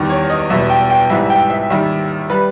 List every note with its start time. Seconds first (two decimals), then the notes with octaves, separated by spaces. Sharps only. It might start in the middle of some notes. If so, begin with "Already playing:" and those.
Already playing: E2 D#3 G3 G4
0.10 C#5
0.30 D#5
0.50 E2 B2 G3 E5
0.70 G5
0.90 G5
1.10 G#2 E3 G3 E5
1.30 G5
1.50 E5
1.70 D#2 D#3 G3 E5
2.30 G3 B4